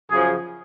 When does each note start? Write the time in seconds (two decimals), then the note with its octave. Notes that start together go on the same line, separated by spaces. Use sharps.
0.10 F#2 C#3 F3 G#4